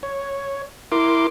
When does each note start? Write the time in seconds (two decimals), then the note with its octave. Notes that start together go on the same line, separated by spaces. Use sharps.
0.03 C#5
0.92 E4 A#4 C6 D6